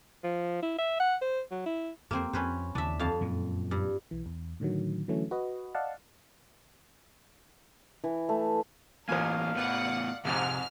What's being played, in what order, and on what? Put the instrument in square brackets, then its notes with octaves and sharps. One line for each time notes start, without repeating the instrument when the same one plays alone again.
[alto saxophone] F3
E4
E5
F#5
C5
F#3
E4
[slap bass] F2 [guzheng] A#3 C4 C5
[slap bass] F2 [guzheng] C#4 B4 C5
[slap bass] D#2 C#3 E3 [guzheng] D4 E5
[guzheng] F2 F5 A5
[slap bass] F#2 A#2
[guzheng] G2
[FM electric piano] B1 E3
E2
A2 D3 D#3 F#3
D3 E3 F#3 A3 C#4
F#4 B4 D#5
D5 D#5 F5 F#5 A5
[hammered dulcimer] E3
A3
[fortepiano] A1 F4 G#5 [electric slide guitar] E3 A#3 [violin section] A#4 [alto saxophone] F5
[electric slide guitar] A2 B3 B4 [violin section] D5 F#5
[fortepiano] C2 F2 G#2 [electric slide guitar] C3 G4 A#5 [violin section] F6